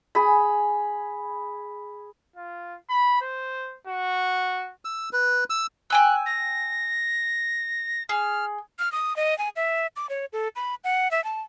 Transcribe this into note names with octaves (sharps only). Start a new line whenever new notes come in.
G#4 B5
F4
B5
C5
F#4
E6
B4
E6
G5 G#5 E6 F#6
A#6
G#4 F6
F6
D#6
D#5
G#5
E5
D6
C#5
A4
B5
F#5
E5
A5